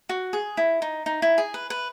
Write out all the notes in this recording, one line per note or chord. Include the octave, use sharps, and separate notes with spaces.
F#4
G#4
E4
D#4
D#4
E4
G#4
B4
B4